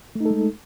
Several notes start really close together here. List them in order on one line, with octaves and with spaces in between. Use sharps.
A3 D#4 A4 G#3